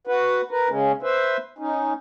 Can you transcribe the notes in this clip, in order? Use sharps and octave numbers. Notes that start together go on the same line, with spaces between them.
F#4 B4
A#4 B4
C#3 G#3 C#4
B4 C5 E5
C#4 D#4